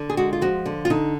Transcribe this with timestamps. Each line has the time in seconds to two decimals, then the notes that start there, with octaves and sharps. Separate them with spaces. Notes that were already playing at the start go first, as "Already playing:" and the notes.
Already playing: D3
0.10 G#4
0.17 G#3 F#4
0.33 F4
0.41 F3 F#4
0.66 D3
0.85 F4
0.90 D3 D#4